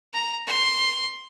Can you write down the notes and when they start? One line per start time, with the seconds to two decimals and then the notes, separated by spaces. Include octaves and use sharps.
0.13 A#5
0.47 C6